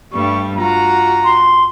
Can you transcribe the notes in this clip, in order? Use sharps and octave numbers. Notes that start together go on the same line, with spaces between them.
G2 G3 A3 C#6
F4 F#4 A#5
C6